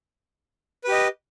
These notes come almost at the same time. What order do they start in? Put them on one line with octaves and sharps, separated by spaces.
B4 G4 D#5